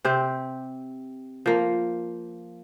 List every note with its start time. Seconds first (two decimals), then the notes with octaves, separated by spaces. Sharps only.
0.05 C3 C4 G4
1.46 F3 A#3